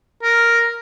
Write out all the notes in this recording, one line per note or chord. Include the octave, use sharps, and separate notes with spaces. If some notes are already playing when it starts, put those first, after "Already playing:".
A#4